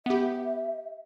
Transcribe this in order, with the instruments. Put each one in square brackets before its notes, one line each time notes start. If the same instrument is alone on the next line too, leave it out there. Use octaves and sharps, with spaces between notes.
[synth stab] B3 G4 [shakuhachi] E5